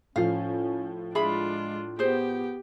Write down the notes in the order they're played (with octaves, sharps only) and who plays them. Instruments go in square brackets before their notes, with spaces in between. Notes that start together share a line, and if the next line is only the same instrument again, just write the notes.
[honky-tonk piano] A2 F3 [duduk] C#4 [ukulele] F5
[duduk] G#3 [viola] D4 F4 [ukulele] G#4 E5 B5
[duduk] B3 [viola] G4 [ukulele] G#4 C5